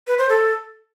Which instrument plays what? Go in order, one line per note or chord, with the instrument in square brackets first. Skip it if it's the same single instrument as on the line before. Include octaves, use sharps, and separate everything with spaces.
[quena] B4
C5
A4